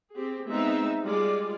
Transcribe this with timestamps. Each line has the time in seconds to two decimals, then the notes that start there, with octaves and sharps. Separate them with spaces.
0.16 C4 G4 G#4
0.50 G#3 B3 C4 D#4 E5
1.04 G3 G#3 F4 D5